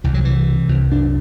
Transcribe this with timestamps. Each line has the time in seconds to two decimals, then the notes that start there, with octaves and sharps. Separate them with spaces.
0.04 C2 E3
0.14 F#3
0.25 C3 E3
0.48 C3
0.69 C2
0.91 F#2 D4